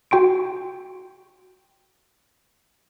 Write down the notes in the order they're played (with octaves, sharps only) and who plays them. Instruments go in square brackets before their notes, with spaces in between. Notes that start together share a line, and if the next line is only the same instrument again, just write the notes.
[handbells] F#4 G5 C6 D7